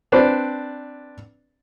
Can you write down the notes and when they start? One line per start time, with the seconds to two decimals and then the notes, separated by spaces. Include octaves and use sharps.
0.12 C4 D4 B4 D5